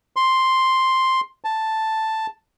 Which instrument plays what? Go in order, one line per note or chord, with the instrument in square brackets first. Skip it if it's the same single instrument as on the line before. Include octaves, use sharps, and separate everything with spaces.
[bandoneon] C6
A5